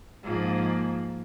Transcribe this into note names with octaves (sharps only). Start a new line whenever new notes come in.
G#2 F3 A#3